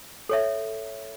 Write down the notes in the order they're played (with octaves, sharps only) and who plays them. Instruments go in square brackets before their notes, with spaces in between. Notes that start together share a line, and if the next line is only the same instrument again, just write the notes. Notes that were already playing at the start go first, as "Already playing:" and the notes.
[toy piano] A4 C#5 E5